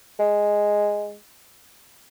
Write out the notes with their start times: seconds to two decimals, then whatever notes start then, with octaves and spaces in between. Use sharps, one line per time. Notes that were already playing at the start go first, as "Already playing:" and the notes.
0.19 G#3